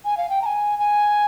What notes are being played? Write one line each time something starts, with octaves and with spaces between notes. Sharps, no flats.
G#5
F5
G5
A#5
G#5
G#5